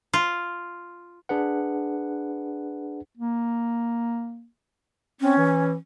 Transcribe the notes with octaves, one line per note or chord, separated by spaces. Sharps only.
F4
D4 G#4 B4 F#5
A#3
C4 C#4
E3